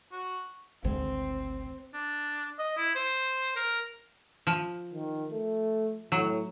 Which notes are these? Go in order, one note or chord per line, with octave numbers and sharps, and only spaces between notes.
F#4
G#1 D2 G#2 C4
D4
D#5
E4
C5
A#4
F3
D#3
A3
A2 F#3